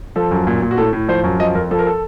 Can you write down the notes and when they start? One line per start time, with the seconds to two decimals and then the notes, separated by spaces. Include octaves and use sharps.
0.16 F3 A4
0.31 F#2
0.47 A#2
0.62 A#2
0.71 F#4
0.78 A2 A4
0.93 A2
1.08 F3 C5
1.24 F#2
1.40 F3 D#5
1.55 F2 A#4
1.71 F3 A4
1.79 A#4
1.87 A4